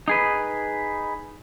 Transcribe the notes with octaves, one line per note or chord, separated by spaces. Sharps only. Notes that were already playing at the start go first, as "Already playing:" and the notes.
D#4 G#4 B4